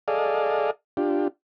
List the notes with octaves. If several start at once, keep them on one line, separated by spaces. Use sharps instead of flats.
G#4 A4 D5 D#5 F5
D4 F4 G4